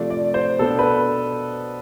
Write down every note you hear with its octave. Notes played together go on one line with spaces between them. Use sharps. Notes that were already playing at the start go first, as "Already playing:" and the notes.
Already playing: C3 F3 A3 D5
D5
C5
B2 B3 D4 A4
B4